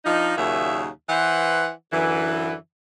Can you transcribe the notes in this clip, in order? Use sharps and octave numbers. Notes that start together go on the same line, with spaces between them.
F3 D4 D#4
D#2 A#2 C#3 F#3 E5
E3 B4 C5 F#5
F#2 D3 E3